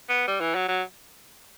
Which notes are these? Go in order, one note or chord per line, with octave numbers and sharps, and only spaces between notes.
B3
G3
E3
F#3
F#3